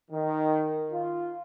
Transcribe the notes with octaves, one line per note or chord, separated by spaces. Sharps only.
D#3
F4